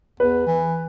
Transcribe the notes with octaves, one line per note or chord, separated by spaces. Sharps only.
E2 B4
E3